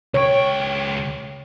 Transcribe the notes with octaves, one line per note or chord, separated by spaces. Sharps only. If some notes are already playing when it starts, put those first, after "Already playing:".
C#2 C#5 G5